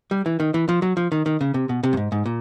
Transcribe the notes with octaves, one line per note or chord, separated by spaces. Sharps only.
G3
E3
D#3
E3
F3
F#3
F3
D#3
D#3
C#3
C3
B2
C3
G2
G#2
G#2
A#2